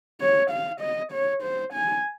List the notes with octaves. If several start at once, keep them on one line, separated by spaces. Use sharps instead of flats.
C#5
F5
D#5
C#5
C5
G#5